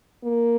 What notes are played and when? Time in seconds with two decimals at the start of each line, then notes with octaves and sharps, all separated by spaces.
0.24 A#3